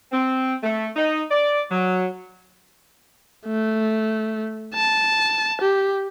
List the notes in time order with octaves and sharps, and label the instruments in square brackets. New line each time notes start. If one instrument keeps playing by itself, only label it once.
[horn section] C4
A3
D#4
D5
F#3
[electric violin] A3
A5
G4